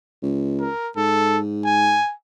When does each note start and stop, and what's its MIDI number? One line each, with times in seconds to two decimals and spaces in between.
0.22 0.68 37
0.60 0.89 70
0.97 1.99 44
0.97 1.38 69
1.65 2.13 80